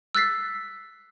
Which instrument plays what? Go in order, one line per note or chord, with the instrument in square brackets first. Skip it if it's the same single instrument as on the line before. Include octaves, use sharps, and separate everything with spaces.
[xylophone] E6 F#6 A6 B6 C7